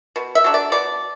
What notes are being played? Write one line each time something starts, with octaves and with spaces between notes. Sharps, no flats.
B2
E5
F#3 A3 D4
D5
B2 D5